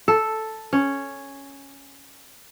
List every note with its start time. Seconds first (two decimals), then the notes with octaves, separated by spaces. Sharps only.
0.08 A4
0.73 C#4